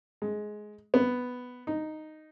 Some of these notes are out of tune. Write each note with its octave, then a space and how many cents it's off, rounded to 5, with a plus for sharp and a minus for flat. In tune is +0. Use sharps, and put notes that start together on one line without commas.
G#3 +15
B3 +5
D#4 -5